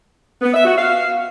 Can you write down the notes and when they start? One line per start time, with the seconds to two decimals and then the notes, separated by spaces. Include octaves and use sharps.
0.41 B3
0.53 E5
0.65 F#4
0.76 F5